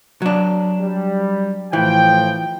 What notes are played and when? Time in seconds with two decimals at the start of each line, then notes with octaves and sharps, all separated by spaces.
0.22 F#3 D4
0.81 G3
1.73 A2 E3 F3 G5